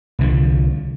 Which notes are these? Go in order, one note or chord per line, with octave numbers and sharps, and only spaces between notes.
C2 D3 F3